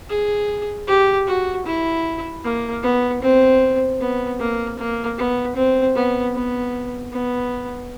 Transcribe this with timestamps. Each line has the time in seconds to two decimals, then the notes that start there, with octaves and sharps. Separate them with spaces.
0.09 G#4
0.87 G4
1.27 F#4
1.66 E4
2.44 A#3
2.83 B3
3.22 C4
4.00 B3
4.40 A#3
4.78 A#3
5.18 B3
5.56 C4
5.95 B3
6.35 B3
7.12 B3